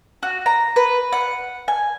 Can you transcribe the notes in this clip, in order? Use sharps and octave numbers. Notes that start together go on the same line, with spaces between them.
F#4
A#5
B4
F#5
G#5